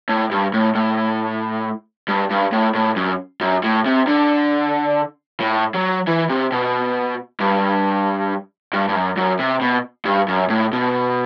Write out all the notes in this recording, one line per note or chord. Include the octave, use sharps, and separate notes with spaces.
A2
G2
A2
A2
G2
G2
A2
A2
F#2
F#2
A2
C3
D3
A2
F#3
E3
C3
B2
G2
G2
G2
F#2
F#2
C3
B2
G2
F#2
A2
B2